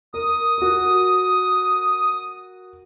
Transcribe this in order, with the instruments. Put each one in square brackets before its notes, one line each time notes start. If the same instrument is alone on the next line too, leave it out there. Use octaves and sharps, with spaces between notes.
[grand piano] A#4 [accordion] D#6
[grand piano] F#4 A#4